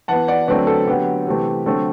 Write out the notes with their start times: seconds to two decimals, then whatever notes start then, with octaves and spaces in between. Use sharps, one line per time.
0.08 E3 B3 F#5 A5
0.28 D5 F#5
0.48 D3 F#3 A3 C4 B4 D5
0.67 A4
0.87 D3 F#3 B3 G4
1.27 C3 E3 A3 C4
1.66 D3 F#3 A3 C4 A4